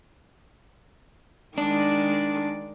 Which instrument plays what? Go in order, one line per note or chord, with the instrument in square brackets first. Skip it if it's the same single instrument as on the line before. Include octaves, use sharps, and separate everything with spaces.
[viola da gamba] D#3 G#3 D5 [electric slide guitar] D4